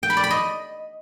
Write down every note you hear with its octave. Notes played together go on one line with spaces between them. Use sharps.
G5
B5
D5
B5
D#5